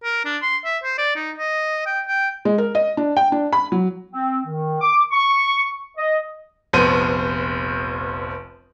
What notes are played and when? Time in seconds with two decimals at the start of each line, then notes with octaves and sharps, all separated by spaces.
0.04 A#4
0.25 D4
0.42 C6
0.65 E5
0.84 C5
0.98 D5
1.15 D#4
1.38 D#5
1.86 G5
2.08 G5
2.45 G#3
2.58 A#4
2.75 D#5
2.97 D4
3.17 G5
3.32 D4
3.53 B5
3.72 F#3
4.10 C4
4.46 D#3
4.81 D6
5.11 C#6
5.97 D#5
6.73 F1 A#1 F3 B3 C5 D#7